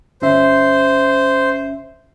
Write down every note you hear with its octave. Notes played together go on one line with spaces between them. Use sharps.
G1 C#4 C5 E5